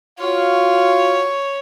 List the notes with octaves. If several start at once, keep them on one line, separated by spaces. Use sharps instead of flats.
F4 F#4 C#5 F5